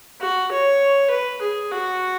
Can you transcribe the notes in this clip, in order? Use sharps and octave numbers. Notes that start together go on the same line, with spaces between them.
F#4
C#5
B4
G#4
F#4